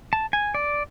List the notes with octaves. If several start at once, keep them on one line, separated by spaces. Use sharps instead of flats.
A5
G#5
D5